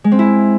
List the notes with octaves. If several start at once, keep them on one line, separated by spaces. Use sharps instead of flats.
G#3
C4
E4